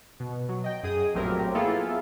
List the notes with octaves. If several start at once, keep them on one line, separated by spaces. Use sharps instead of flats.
B2
F#3
D#5 G5
F#2 G#4 D#6
A#1 A2 F#3 C4 G4 A#4
A#3 B3 E4 F4 G#4 A4